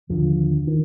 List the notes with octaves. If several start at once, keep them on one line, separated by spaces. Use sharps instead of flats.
D#2 D3 F3
D#3